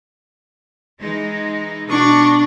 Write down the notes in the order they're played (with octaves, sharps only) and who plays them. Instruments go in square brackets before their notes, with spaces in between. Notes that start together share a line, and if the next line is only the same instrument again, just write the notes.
[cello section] E3 G#3 D#4
[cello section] B2 F#4 [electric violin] D4 [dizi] C#6